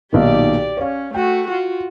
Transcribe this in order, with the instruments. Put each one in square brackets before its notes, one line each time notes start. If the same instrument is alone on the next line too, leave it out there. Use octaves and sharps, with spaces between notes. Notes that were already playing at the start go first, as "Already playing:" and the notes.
[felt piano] B1 A#2 D#3 [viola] G4 D5
[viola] C#4 [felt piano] C#5 F5
[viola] A3 F#4 [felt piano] G5
[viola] F4 F#4